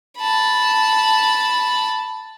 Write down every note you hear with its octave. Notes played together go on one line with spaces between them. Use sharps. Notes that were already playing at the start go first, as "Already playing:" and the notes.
A5 B5